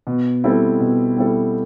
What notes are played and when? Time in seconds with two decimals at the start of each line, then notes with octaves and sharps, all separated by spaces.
0.07 B2
0.44 G3 C4 E4 A4
0.80 B2
1.17 G3 C4 E4 A4